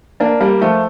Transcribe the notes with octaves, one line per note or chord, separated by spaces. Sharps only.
A#3 D4
G3 A#3
F3 A3